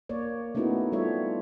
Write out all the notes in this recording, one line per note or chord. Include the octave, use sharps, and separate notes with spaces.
A#3 C#5 D5
A3 B3 C#4 D#4 E4 F#4
G3 F4 A4 C#5 E5